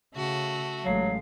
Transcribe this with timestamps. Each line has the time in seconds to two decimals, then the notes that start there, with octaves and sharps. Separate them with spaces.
0.15 C#3 A3 F#4
0.84 A1 F#3 G#3 A3 F5